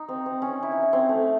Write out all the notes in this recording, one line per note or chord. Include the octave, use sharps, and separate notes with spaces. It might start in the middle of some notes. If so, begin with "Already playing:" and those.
Already playing: D#4
C4
C4
C#4
E4
D#4
C#4
C4
A3